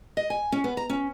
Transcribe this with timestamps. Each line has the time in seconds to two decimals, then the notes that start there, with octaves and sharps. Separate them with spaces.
0.17 D#5
0.30 G#5
0.52 C#4
0.64 B3
0.77 A#5
0.89 C#4